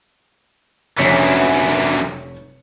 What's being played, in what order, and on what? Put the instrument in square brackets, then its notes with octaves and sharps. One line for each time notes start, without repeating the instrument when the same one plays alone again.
[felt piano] F1 C#5 C#7 [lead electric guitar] C2 D4 [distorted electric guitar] F#2 E3